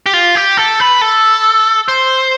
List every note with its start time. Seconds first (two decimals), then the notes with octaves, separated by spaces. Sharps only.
0.06 G4
0.13 F4
0.35 G4
0.57 A4
0.80 B4
1.01 A4
1.88 C5